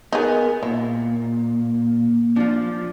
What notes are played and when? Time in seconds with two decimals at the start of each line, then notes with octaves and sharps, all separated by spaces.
0.12 B3 D#4 G#4 A#4
0.63 A#2 A#3 E4
2.36 F3 D4 F4